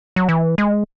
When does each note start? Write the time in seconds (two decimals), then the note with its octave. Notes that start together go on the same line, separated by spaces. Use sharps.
0.16 F#3
0.29 E3
0.58 G#3